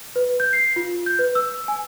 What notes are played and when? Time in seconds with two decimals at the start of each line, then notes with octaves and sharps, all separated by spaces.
0.16 B4
0.40 G6
0.53 C7
0.76 F4
1.06 G6
1.19 B4
1.35 E6
1.68 G#5